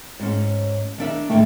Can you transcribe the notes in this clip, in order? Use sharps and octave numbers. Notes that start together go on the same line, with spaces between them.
G#2 C#4
D#3 D4 E5
G#2 D3 D#3 A3